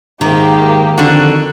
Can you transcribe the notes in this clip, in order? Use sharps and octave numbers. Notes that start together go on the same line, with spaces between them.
G#2 D#3 A#3 G4
F2 D3 F#4